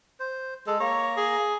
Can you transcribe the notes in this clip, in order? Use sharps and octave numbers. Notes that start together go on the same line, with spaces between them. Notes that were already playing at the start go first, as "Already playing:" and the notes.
C5
G#3 A4
A#3 C#5 A#5
G#4